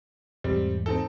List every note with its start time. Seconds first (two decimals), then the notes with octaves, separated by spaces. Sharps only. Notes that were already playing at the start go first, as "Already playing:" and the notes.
0.44 E2 G#2 G3 A3 C4
0.86 C4 D#4 A4